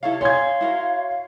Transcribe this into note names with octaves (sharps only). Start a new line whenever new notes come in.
C3 E4 A4 C#5 F5
G4 C#5 F5 G#5 C6 G#6
E4 F#4 A#4